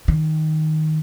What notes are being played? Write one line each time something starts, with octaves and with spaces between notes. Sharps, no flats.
D#3